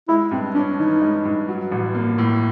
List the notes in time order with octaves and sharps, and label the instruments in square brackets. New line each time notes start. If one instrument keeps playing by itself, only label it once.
[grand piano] G#3 [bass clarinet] E4
[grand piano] G2 [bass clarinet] C4
[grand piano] C#4 [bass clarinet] D4
[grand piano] E3 [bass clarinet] D#4
[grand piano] G#3
G2
F#3
A1
A#3
A2